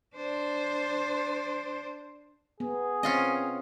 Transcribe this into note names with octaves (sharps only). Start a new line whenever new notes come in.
D4 C5
B3 G#4
C4 C#4 F4 D#5